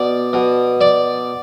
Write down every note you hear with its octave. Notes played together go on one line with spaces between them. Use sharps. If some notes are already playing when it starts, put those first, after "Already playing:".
Already playing: B2 D5
B2
D5